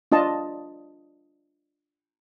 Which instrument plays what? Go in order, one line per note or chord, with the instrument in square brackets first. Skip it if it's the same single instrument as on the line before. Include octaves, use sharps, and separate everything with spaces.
[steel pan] D4 F4 D#5 A5